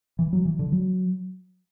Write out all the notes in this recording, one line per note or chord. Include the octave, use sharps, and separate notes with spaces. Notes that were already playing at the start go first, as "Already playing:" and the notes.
E3
F#3
E3
D3
F#3